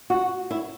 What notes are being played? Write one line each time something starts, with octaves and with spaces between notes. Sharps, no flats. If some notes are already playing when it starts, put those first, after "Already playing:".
F#4
E4